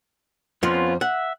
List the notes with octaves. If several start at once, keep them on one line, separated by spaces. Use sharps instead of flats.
F2 F3 B3 C#4 F4
E5 F#5